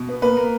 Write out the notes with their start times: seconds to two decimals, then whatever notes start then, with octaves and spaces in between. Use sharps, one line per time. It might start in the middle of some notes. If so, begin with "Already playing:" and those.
Already playing: B2
0.09 B3
0.22 A#3 B4
0.37 A#3